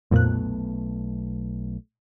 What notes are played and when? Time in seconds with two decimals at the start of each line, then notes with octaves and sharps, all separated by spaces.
0.11 B1 F2 A#2 A3 B3 F#6